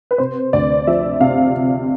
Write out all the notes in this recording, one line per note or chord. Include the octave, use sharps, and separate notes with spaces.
B4
C3 C5
D2 D5
F3 E5
C3 F5